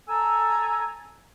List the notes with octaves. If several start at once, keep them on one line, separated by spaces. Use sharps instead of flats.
A4 G#5 A#5 E6